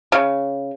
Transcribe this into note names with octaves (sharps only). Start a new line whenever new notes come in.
C#3